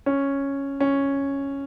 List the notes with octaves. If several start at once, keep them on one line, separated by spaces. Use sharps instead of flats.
C#4
C#4